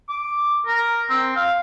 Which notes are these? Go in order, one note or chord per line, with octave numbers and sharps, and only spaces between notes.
D6
A#4
C4
F5